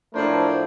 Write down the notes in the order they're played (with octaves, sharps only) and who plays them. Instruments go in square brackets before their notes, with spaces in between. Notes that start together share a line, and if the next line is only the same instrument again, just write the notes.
[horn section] A2 F3 A3 D4 A#4 C5